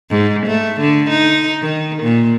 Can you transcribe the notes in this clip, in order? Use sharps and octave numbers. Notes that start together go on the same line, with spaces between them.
G#2
A3
D3
D#4
D#3
A#2